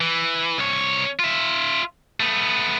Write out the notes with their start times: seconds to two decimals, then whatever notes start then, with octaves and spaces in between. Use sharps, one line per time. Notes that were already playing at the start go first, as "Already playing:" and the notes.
0.01 E3
0.58 C2 C#5
1.20 F4 E5
2.20 A3 B3